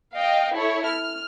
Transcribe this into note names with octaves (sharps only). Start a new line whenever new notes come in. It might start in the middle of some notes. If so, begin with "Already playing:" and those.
D#5 F5 G5
E4 A4 C#5
F6